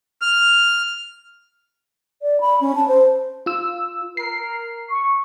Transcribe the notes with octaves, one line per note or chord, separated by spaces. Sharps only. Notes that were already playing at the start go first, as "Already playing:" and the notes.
F6
D5
B5
C#4
A5
C5
F4 E6
A#4 C7
C#6